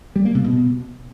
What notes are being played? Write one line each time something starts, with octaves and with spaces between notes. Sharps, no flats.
G3
A#3
C3
B2